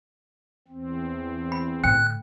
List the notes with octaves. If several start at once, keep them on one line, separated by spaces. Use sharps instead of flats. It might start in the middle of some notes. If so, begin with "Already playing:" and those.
E2 C4
B5
A2 D3 G5 F#6